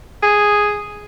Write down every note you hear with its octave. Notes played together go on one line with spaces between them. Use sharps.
G#4